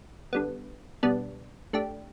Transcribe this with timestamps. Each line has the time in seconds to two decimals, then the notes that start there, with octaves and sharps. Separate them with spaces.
0.33 D3 G3 B3
1.03 B2 G3 B3 D4
1.73 A3 D4 G4